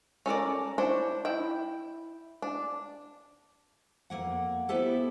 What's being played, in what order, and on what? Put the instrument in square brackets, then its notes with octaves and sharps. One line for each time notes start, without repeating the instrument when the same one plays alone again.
[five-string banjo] C#4 A4 A#4 D5
D4 E4 C5 C#5
E4 G5
D4
[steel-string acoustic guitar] F2 E3 A#3 F#5
B3 E4 G4 A4 C5